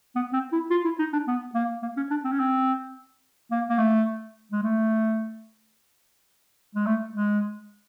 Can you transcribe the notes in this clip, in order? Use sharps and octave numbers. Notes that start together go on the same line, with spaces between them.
B3
C4
E4
F4
E4
D#4
D4
B3
A#3
A#3
C#4
D4
C4
C#4
C4
A#3
A#3
A3
G#3
A3
G#3
A3
G#3